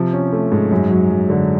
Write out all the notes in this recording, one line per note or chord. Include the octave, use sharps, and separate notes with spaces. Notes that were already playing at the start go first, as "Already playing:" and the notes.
Already playing: C3 F3
C#4
A3
G#2
F#2
F#3
F#3
D3